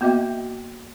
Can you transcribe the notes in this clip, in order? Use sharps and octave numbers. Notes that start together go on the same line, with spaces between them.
A#3 B3 F#4 D#5 E5 G5